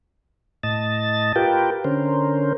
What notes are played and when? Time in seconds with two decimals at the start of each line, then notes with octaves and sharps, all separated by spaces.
0.63 A2 D#5 A5 A6
1.36 F4 G4 A#4 B4 G5
1.84 D3 C#4 A#4 C5